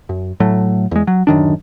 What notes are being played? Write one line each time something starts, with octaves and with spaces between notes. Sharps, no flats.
F#2
A2 F#3 A3
E2 G#3
F#3
D1 F#2 D#3 D4